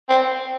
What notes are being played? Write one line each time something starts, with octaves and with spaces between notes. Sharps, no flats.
C4